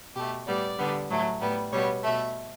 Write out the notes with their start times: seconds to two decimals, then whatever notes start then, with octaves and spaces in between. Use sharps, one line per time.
0.15 B2 A3 G4
0.47 A2 G3 B3 D5
0.78 D3 G3 B3
1.09 A2 F#3 A3
1.41 A2 G3 B3
1.72 B2 G3 B3 C#5
2.03 B2 A3 E5